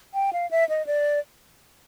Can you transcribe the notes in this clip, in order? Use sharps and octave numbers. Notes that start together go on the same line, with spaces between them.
G5
F5
E5
D#5
D5